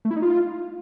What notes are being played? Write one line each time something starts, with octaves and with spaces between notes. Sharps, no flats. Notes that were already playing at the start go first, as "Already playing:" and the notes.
A3
E4
D#4
F4